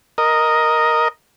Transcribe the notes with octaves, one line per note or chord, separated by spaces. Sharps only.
A#4 D#5